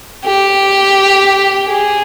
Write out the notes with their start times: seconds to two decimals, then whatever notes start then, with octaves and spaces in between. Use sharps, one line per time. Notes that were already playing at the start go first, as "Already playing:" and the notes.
0.25 G4
1.69 G#4